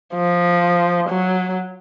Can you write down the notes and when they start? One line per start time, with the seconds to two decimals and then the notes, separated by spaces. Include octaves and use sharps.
0.15 F3
1.10 F#3